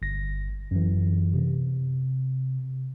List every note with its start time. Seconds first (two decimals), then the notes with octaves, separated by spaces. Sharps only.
0.02 G1 A#6
0.71 F#2 E3
1.34 C3